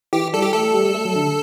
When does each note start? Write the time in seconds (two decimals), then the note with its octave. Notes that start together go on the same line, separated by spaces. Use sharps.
0.13 E3 G4
0.33 G3 A4
0.42 G4
0.53 A3 A4
0.74 G3
0.85 G3
0.94 A3
1.05 F#3
1.15 D3